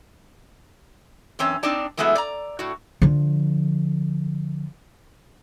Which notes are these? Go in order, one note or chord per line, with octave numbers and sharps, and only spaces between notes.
F#2 E3 C4 C#4
C4 D4 D#4 D5 A5
E3 F#3 G#3 A3 B3 E4
D5 A#5
A2 F#4
D3 F3